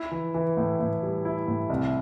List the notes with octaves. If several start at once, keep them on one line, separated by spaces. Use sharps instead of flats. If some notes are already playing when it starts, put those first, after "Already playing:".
Already playing: E4
E3
E3
A2
A2
G3
E4
A2
C2